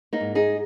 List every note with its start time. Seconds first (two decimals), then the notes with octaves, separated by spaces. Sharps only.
0.13 A#3 D#4
0.20 G#2
0.35 D#4 G#4